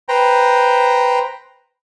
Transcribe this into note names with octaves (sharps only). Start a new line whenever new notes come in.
B4 C5 G5 A#5